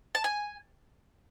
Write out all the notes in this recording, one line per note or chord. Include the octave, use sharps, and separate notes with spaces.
A5
G#5